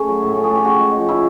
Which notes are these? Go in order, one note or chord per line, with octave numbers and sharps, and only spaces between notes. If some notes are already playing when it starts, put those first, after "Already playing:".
Already playing: A3 C#4 G#4
F#3
A2
C#4 A4
G#4
A3
G4
C#3 F#4
G#3
F3
C#3 E4